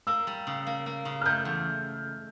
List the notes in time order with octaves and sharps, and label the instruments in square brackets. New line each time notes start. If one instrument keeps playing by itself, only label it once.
[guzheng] A#3 [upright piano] E6
[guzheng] G3
C#3
A#3
A#3
C#3
[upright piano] F6
[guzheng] A3 [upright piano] G6
[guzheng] E2